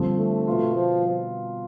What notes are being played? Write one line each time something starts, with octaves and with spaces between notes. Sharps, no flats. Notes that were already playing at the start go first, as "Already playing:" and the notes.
Already playing: G2 D3 F3 C4
A3
B2 B3 F4
F3